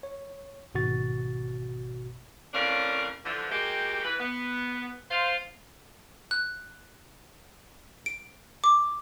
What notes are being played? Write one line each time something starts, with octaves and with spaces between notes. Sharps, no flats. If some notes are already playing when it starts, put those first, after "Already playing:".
C#5
G#1 B2 F#4 C#6 A6
F2 A2 C#4 D4 A#4 F5
D3 E3 F3
G#3 A#3 F#4 G4
E3 B4
B3
F4 C5 F5
F#6
D7
D6